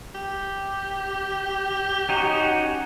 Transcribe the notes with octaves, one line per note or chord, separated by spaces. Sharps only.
G4
C#4 D#4 F#4